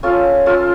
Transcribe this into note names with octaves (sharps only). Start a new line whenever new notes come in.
C#4 F4 A4
C#4 F4 A4